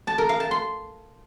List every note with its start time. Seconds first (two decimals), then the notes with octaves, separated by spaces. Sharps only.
0.07 A5
0.18 A#4
0.29 F5
0.40 A5
0.51 C6